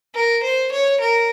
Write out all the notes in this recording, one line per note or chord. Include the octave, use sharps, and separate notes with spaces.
A#4
C5
C#5
A#4